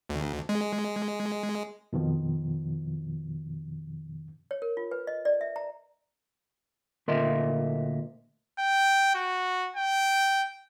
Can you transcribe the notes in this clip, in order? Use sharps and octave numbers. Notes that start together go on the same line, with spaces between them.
D2
G#3
F2 B2 D#3 F3
C#5
A#4
F4
B4
D#5
D5
E5
A#5
D2 A#2 A#4 D#5 E5 C6
G5
F#4
G5